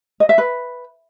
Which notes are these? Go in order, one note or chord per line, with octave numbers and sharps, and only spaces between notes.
D#5
E5
B4